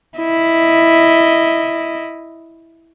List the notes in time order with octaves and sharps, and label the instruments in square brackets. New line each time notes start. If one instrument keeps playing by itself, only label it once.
[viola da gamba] E4 D#5